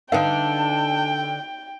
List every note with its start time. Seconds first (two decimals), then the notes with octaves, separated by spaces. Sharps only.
0.12 D3 D#4 B4 E5 F5 G5 A5